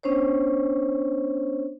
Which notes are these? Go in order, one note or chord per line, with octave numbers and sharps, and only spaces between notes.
B3 C#4 D4 C5 C#5